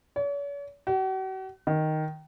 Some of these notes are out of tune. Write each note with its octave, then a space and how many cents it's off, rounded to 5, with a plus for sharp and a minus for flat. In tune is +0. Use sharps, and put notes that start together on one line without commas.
C#5 +45
F#4 +45
D#3 +0